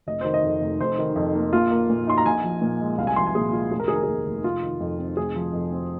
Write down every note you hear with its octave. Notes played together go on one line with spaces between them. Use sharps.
F1 D#5
D#3 C5
D#5
F2
F1
F1 C5
D#3
F2
A#3
A#1 F4
A#3
A#2
D#4 C6
A#5
A#1 G#5
F3
A#2
G#3
C2 F5
G#5
F3 C6
G#5
A#2 G#4
G#3 F4
F1 G#4
A#4
D#3 G#4
A#4
G#4
D#2
F1
F1 F4
D#3
F2
C4
F1 G#4
F3
F2
C4